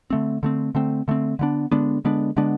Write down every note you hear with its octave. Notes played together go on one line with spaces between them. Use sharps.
D3 A3 C4
D3 A3 C4
D3 A3 C4
D3 A3 C4
D3 G#3 B3 D4
D3 G#3 B3 D4
D3 G#3 B3 D4
D3 G#3 B3 D4